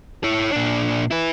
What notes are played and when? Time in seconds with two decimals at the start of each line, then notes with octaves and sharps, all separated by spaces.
0.24 E4 C#5
0.52 A#2 D4
1.11 E4 B4